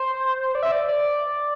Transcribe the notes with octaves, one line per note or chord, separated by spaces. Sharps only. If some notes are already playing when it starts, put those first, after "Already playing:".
Already playing: C5
D5
E5
D5
D5